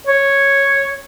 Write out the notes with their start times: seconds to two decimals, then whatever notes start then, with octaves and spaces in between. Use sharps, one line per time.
0.07 C#5